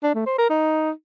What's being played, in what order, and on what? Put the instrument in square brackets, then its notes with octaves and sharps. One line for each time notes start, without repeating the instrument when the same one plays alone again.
[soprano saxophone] D4
A3
C5
A#4
D#4